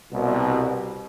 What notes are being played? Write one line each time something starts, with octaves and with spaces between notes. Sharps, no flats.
C2 B2